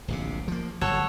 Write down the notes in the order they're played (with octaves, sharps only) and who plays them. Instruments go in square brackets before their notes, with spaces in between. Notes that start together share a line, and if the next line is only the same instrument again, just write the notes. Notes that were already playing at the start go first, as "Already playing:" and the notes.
[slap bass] D1 A#1 C3
F3 A#3
[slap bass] G1 A2 F#3 [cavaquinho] A4 C#5 F#5